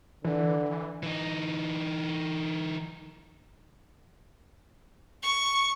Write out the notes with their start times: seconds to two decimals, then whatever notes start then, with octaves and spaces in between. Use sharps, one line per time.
0.25 D3 E3
1.03 E3 D#4
5.23 C#6